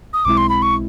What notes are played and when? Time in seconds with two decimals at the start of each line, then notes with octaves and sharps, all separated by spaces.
0.13 D#6
0.25 B1 B2 G#3 C4 E4 D6
0.37 C6
0.49 B5
0.62 C#6